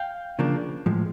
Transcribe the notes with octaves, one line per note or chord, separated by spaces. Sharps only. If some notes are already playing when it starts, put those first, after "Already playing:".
Already playing: F5 G5
C#3 F3 A#3 D4
A2 F3 G#3